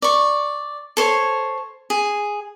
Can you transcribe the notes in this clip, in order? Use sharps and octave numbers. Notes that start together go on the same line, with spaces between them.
D5 C#6
A4 C5 C#5
G#4